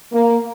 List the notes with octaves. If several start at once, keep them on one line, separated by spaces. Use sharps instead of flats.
A#3